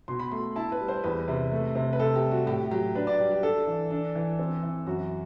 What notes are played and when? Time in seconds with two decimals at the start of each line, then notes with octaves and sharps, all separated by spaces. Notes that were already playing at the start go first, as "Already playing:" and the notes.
0.08 B2 C6
0.19 B5
0.31 A3 C6
0.56 E4 A5
0.72 B4
0.80 G3
0.88 C5
1.04 E2 B4
1.28 C3
1.51 A3
1.75 C3
1.93 B4
1.99 C3 A4
2.15 G4
2.23 G3
2.31 F#4
2.47 A2 G4
2.71 F#3 G4
2.95 D4 B4
3.07 D5
3.19 G3 G4
3.31 G4
3.43 D4 A4
3.67 E3
3.91 D4
4.15 E3
4.39 C4
4.63 E3
4.86 F#2 F#4